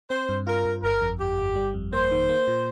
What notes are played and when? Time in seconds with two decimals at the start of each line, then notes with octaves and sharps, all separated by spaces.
0.10 C4 C5
0.29 G2
0.47 F4 A#4
0.65 G2
0.83 G1 A#4
1.01 F2
1.19 G1 G4
1.38 G1
1.56 G3
1.74 F2
1.93 A#3 C5
2.11 D#3
2.29 A#3
2.48 A#2